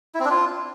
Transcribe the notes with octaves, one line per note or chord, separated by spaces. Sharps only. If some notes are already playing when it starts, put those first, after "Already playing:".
E4
C4
D4
F4